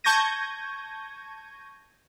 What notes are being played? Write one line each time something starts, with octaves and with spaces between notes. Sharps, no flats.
A5 C#6 G6 G#6 A#6 D#7